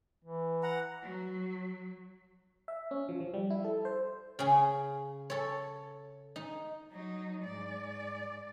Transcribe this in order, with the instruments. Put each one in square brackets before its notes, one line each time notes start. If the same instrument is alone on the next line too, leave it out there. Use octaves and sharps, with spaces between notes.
[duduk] E3
[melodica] F#5 A#5
[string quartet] F#3
[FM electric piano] E5
C#4
F3
F3
G3
E4
A4
C5
[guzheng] C#3 G#4
A4 C#5
D#4
[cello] F#3 D#4
G#2 D5